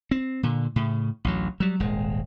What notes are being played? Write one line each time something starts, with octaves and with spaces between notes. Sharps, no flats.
C4
A#2 D3
A2 C#3
A1 D2 F#3
F#3 G3
D#1 G#1 G#3